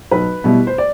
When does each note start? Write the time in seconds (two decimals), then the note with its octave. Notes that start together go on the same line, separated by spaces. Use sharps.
0.11 B1 B4
0.44 B2 G3 B3 E4
0.67 C5
0.78 D5